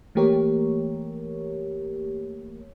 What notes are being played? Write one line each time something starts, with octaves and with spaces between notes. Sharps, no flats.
E3 A3 A#3 G4 A#4 C#5